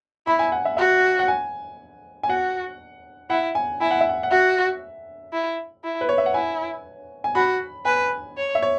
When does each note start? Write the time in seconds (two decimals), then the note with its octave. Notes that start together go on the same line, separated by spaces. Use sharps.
0.27 E4 B5
0.39 G#5
0.52 F#5
0.65 E5
0.77 F#4 E5
1.19 F#5
1.28 G#5
2.23 G#5
2.29 F#4 F#5
3.30 E4 F#5
3.55 G#5
3.81 E4 G#5
3.91 F#5
4.01 E5
4.09 F#5
4.23 F#5
4.31 F#4 E5
5.33 E4
5.84 E4
6.01 B4
6.09 C#5
6.18 E5
6.26 F#5
6.34 E4 G#5
7.24 G#5
7.35 F#4 B5
7.85 B4 G#5
8.37 C#5
8.55 E5
8.62 C#5